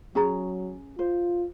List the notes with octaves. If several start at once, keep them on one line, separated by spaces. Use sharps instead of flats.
F#3 C#4 G#4 A#5
F4 C5